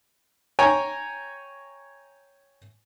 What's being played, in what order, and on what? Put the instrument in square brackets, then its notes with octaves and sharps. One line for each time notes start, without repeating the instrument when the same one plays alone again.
[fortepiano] C#5 G5 G#5 A#5